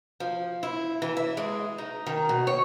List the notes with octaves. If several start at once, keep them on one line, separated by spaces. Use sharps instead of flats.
F3
E4
E3
E5
G#3
D#4
D#3
B2
C#5